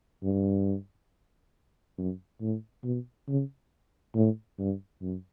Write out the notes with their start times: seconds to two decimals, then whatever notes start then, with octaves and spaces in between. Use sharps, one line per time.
0.23 G2
1.98 F#2
2.41 A2
2.84 B2
3.28 C#3
4.15 A2
4.59 G2
5.02 F#2